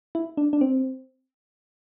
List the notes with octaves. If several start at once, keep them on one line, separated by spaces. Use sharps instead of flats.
E4
D4
D4
C4